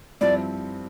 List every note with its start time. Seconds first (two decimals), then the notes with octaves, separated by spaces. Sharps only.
0.21 G2 F3 C4 E4 D5